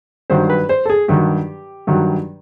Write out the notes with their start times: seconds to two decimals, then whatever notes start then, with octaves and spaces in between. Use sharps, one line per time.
0.30 G2 D#3 F#3 C5
0.50 B4
0.69 C5
0.86 A4
0.90 G#4
1.08 G2 D#3 F#3 G4
1.87 G2 D#3 F#3